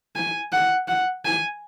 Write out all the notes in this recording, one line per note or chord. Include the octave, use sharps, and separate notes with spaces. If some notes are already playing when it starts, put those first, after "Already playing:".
G#5
F#5
F#5
G#5